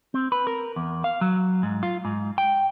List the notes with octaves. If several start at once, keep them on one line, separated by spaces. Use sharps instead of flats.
C4
B4
A#4
E2
F5
F#3
G#2
F4
G#2
G5